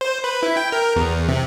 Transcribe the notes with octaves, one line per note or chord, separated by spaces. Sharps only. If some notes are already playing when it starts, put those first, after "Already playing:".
C5
B4
E4
G5
A#4
E2
C3